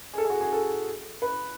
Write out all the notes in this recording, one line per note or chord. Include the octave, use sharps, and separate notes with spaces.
G#4
A4
G#4
F#4
G#4
A4
B4